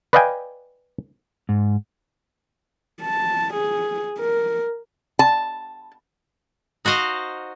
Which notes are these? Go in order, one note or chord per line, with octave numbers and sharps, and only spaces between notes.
B4 D5 D#5 F5 G5 G#5
G#2
A5
G#4
A#4
A5
D#4 F#4 C5 D#5 F5